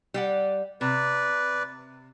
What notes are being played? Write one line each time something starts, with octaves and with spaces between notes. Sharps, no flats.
G3 D5 F#5
C3 B4 D5